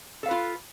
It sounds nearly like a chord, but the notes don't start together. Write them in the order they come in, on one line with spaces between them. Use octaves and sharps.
A4 F5 B4 F4